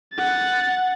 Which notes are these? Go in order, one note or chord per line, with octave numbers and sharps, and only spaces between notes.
F#5 A6